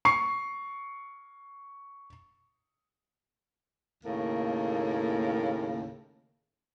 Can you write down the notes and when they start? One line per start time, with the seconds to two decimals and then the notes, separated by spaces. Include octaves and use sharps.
0.05 C#6 C7
4.04 D#2 A2 C#3 A#3